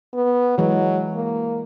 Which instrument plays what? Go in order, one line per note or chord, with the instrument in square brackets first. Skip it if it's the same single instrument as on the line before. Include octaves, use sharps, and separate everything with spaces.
[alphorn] B3
[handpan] E3 G#3 [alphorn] F#3
[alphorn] A#3